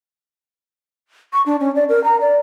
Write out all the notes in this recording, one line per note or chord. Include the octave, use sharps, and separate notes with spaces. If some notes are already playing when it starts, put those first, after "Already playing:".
C#6
D4
C#4
D5
A#4
A#5
D5